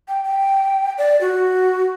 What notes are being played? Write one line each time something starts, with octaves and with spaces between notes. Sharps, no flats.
G5
G5
D5
F#4